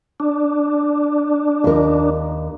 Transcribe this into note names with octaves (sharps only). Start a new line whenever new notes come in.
D4
D#2 A#4